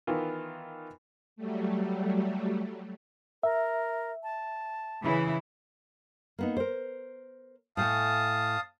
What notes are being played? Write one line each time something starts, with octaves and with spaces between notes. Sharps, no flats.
D#3 E3 B3 F4
F#3 G3 A3
A#4 E5
A5
C#3 E3 E4
A#3 B3 D#4
A#4 C5
A2 A3 F5 G#5 A5 D#6